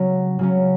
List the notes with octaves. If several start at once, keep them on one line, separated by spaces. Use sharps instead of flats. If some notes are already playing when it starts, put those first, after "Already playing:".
Already playing: C#3 F#3 C#4
C#3 F#3 C#4